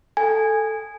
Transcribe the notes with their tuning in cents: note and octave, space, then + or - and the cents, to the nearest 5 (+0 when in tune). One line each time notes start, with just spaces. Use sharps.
A4 +0 G#5 -10